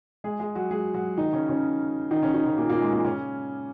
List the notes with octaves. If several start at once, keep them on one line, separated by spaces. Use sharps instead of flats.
G#3 G#4
G#3 G#4
F#3 F#4
G#3 G#4
F#3 F#4
D#3 D#4
C#3 C#4
C#3 C#4
D#3 D#4
C#3 C#4
D#3 D#4
C#3 C#4
A#2 A#3
A#2 A#3
G#3
A#2 A#3
C#3 C#4